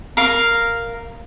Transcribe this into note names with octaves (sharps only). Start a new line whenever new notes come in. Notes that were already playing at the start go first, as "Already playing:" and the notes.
A#4 F5